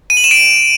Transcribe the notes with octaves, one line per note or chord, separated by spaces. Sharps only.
D#7
F#7
E7
D7